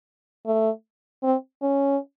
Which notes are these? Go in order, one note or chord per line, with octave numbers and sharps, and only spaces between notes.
A3
C4
C#4